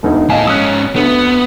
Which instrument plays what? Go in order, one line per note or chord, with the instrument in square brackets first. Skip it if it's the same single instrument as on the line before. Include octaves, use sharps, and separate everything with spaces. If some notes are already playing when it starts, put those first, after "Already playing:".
[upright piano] E1 D2 D#4
[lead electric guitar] A2 A5 [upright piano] D#5 F5 G#5
[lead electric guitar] G#2 C#4 [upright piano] D#6 F#6
[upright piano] D2 [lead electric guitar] B3